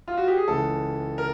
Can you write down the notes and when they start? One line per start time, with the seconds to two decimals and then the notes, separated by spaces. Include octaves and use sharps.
0.08 F4
0.17 F#4
0.27 G4
0.37 G#4
0.48 C#2 C#3 E3 A4
1.18 A#4